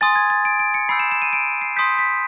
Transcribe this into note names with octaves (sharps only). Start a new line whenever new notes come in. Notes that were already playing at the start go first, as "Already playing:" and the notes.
G#5 C6 D#6 A6
G#6
A6
D7
D7
C#7
B5 E6 G6 C7
E7
E7
D#7
D7
C7
C6 D#6 G6 B6
B6